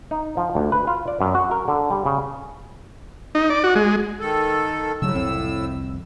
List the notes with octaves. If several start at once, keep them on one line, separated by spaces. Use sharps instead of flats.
D#4
F3
D2
B4
F4
D5
F#2
F#4
A#4
D3
G3
C#3
D#4
D5
F#4
G#3
D#3 A4
A2 C#3 F#3 G3 E6
C2 F2 C4